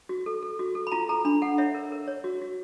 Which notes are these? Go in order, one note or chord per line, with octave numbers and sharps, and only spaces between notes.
F#4
A4
A4
F#4
A4
B5
F4 A#5
A4 A#5
D4 B5
A4 F#5
C#5 E5
A#4
A#4
C#5
F#4
F#4